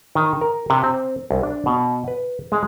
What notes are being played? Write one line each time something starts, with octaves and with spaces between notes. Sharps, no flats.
D#3
A#4
C3
C4
C2
D4
B2
B4
G#3